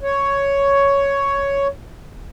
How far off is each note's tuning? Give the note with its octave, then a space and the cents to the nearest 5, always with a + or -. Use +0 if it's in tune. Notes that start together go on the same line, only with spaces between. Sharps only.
C#5 +5